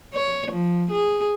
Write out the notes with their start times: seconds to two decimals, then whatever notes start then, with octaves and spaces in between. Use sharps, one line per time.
0.14 C#5
0.51 F3
0.91 G#4